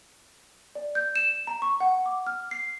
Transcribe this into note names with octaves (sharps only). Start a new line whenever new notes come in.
D5
G6
E7
A#5
C#6
F#5
D6
F6
C7